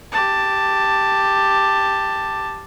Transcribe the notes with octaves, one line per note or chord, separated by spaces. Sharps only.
G4 A5